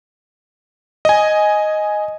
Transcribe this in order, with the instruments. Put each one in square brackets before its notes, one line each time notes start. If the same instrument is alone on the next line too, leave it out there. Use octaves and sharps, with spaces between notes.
[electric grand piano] D#5 G#5